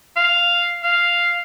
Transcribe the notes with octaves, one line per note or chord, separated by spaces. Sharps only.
F5
F5